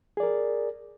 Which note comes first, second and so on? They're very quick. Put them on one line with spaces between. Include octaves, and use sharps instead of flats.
G#4 D5 A#4